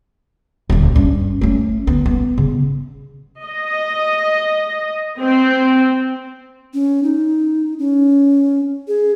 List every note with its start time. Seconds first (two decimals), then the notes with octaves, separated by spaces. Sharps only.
0.70 D#1 D2
0.96 G2 C#4
1.41 A3 C#4
1.87 D2 B3
2.06 B3
2.38 C#3
3.44 D#5
5.20 C4
6.74 C#4
7.03 D#4
7.79 C#4
8.88 G#4